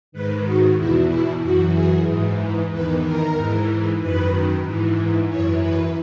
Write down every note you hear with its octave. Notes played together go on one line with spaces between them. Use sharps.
G#2 D#3 B4
F#4
E2 B2 E4
E4
F#2 E3 F#4
G#4
G#2 E3
E2 D#3 B4
A#4
G#2 E3
F#2 D#3 B4
G#2 E3
F#2 E3 C#5
B4